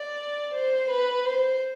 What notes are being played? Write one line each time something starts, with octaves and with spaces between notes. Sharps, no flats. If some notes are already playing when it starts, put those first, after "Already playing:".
Already playing: D5
C5
B4
C5